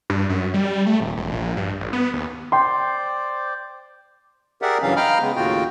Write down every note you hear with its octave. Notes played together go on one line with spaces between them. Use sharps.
G2
F#2
G3
G3
A3
D#1
E1
A#1
G2
A1
B3
D#2
C5 D5 G5 C6
G4 G#4 A#4 D5 E5 F#5
G2 C#3 E3 F#3 C#4 F5
D#5 F5 G5 A#5 B5 F6
C#3 G#3 B3
D#2 A2 C#3 F4 F#4 G5